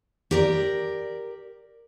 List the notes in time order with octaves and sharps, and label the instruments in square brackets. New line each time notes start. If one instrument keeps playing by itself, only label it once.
[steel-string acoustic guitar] G4 A#4 D5